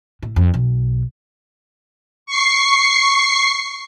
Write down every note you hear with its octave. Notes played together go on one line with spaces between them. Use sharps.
A2
F2
B1
C#6 C7